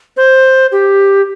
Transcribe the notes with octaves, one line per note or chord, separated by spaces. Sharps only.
C5
G4